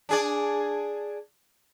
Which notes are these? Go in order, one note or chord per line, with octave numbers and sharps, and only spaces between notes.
D4 G#4 D5